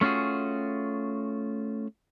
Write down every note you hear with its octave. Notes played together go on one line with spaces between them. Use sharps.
A3 C#4 F4 F#4 G#4